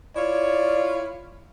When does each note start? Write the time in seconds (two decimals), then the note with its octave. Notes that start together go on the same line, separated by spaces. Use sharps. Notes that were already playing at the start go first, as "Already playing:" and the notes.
0.16 E4 F4 C#5 D5